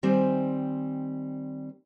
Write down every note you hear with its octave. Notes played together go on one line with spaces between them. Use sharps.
D#3 G3 C4 C5 G#5